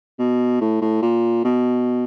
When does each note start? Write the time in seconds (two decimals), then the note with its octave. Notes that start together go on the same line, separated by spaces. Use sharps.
0.19 B2
0.61 A2
0.81 A2
1.02 A#2
1.44 B2